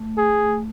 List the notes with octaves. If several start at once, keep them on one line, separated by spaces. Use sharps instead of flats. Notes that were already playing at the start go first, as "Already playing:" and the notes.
Already playing: A3
G#4